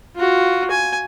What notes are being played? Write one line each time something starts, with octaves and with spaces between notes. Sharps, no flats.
F4 F#4
G#5